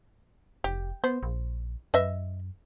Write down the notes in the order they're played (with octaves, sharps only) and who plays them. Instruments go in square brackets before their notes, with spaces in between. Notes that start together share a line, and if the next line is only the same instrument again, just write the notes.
[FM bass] F1 [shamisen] G4
[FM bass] B3 [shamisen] C5
[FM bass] A#1
[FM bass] F#2 [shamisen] B4 D#5 E5